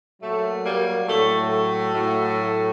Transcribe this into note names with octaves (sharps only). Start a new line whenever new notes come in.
A#2 F#3 A3
G3 A#3
A2 F#3 A3
A3
A2 F#3